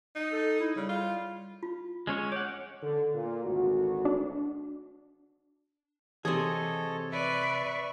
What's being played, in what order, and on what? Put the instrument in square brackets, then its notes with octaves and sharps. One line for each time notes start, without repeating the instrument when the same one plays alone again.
[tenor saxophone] D#4
[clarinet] A4
E4
[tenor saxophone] C#3 [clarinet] G3
[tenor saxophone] F4
[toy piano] F4
[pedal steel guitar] G#3 C#4 C#5
[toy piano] C#5 [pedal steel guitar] F#5 D6
[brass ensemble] D3
A#2
G#1 D2 F#4
[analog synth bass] D4
[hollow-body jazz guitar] C3 G#4 [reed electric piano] E3 [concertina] A4 C#5 D#5
[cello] B4 D5 [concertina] E5 C#6